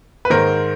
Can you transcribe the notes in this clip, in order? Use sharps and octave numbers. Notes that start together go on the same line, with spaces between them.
B4
G#2 D#3 A#4 C5